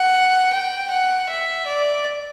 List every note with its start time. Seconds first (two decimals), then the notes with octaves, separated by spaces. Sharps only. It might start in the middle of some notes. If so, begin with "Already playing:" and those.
Already playing: F#5
0.53 G5
0.91 F#5
1.29 E5
1.66 D5